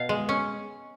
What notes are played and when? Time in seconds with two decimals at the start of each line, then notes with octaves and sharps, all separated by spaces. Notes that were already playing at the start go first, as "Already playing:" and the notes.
Already playing: B2 F5
0.09 G#3
0.29 C#4